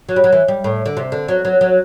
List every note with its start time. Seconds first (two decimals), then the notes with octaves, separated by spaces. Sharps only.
0.09 F#3
0.16 G3
0.24 F#3
0.33 E3
0.48 G3
0.64 A2
0.86 D3
0.97 C3
1.12 D3
1.28 F#3
1.45 F#3
1.61 F#3